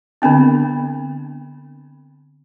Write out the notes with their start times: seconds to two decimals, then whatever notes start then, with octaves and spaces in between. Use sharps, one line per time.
0.22 D3 B3 C4 D4